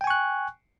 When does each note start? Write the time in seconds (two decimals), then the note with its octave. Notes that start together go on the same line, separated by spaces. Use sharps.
0.01 G5
0.04 G#5
0.07 C#6
0.10 F#6